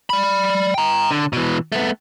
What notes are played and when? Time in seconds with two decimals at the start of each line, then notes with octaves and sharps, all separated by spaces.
0.10 D5 B5
0.74 G5 A#5
1.11 D3
1.33 B2 E3
1.72 A3 B3